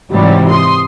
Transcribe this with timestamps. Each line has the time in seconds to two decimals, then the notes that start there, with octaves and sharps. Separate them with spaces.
0.11 G#2 C3 E3 F#3 G3
0.49 C6 D#6